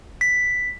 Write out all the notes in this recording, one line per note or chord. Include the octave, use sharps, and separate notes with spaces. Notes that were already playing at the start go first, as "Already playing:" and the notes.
B6